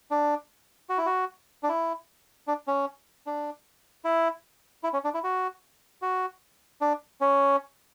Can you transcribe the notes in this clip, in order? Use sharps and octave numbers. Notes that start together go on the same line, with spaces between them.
D4
F#4
E4
F#4
D4
E4
D4
C#4
D4
E4
E4
C#4
D4
E4
F#4
F#4
D4
C#4